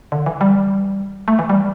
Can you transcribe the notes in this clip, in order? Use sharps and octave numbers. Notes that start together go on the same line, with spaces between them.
D3
E3
G3
A3
E3
G3